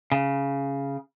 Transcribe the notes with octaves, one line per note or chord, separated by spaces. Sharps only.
C#3